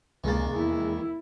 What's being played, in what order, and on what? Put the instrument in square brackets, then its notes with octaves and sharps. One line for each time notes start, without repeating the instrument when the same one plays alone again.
[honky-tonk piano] F1 G#3 A6 [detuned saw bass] C#2 [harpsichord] D#3 A#3
[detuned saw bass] E2 [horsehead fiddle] E4